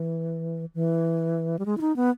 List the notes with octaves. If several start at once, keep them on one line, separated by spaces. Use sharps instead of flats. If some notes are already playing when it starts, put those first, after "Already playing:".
Already playing: E3
E3
G3
G#3
E4
D#4
B3